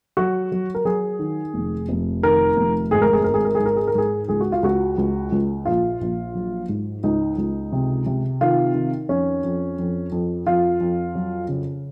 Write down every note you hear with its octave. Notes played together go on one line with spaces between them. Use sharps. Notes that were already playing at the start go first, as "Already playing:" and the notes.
F#3 F#4
F#3
A#4
F#3 G#4
D#3
F1
F1
D#3 A#4
F1
G#1 G#4
A#4
G#4
G#1 A#4
G#4
A#4
G#2 G#4
A#4
G#4
A#4
G#2 G#4
C#2 G#4
F#4
F4
C#2 F#4
C#2
C#2
A#1 F4
A#1
F#3
G#2
C#2 D#4
C#2
C3
C3
D#3 F4
D#3
F2 C#4
F2
F2
F2
F2 F4
F2
F#3
C#3